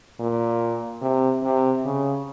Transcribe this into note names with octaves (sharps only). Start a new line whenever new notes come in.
A#2
C3
C3
C#3